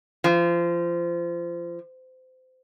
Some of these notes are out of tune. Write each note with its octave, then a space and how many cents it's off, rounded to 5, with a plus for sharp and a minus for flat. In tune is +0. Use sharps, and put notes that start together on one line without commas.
F3 -25